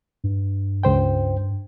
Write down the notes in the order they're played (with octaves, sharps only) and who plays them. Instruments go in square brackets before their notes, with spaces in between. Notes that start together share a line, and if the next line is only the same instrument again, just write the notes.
[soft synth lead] G2
[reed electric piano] C#2 C5 G5